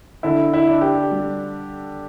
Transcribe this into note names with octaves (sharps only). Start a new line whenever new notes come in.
D3 E4
E4
D4
G4
G3